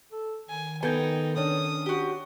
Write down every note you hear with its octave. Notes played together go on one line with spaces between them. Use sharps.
A4
D#3 G#5
B3 D#4 A4 G5 G#5
C#4 D4 D#6
F#4 G4